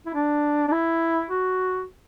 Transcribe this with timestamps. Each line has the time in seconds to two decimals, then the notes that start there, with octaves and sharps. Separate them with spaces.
0.06 E4
0.14 D4
0.68 D4
0.72 E4
1.30 F#4